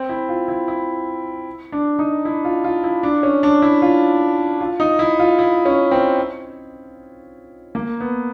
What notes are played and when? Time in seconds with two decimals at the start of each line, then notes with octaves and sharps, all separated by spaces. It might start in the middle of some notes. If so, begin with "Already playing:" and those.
Already playing: C4
0.09 E4
0.29 F4
0.48 E4
0.68 E4
1.72 D4
1.99 D#4
2.25 E4
2.45 F4
2.64 F4
2.84 E4
3.03 D4
3.23 C#4
3.43 D4
3.62 E4
3.82 F4
4.61 F4
4.80 D#4
4.99 E4
5.19 F4
5.39 E4
5.66 C#4
5.91 C4
7.75 A#3
8.01 B3